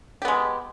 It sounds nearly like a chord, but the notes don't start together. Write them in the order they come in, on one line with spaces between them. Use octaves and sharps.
G4 B3 G#3